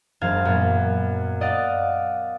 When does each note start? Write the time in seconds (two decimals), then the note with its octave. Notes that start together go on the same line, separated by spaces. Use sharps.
0.21 E1 F#2 C5 F5 F6 G#6
0.45 F#2 A#2 B3
1.41 D5 D#5 F5 F#5 D6 A6